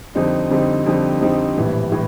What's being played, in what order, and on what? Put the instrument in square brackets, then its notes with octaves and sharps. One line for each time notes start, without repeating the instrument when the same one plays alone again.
[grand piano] F2 D3 G3 C4 D#4
F2 D3 G3 C4 D#4
F2 D3 G3 C4 D#4
F2 D3 G3 C4 D#4
A#1 A2 E3 G3
A2 E3 G3